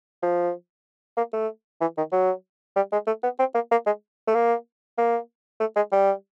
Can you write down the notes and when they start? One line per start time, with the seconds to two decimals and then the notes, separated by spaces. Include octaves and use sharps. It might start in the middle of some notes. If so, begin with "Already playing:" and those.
0.23 F3
1.17 A#3
1.33 A3
1.81 E3
1.97 D#3
2.12 F#3
2.76 G3
2.92 G#3
3.07 A3
3.23 B3
3.39 C4
3.54 A#3
3.71 A#3
3.86 G#3
4.27 A3
4.35 A#3
4.98 A#3
5.60 A3
5.76 G#3
5.92 G3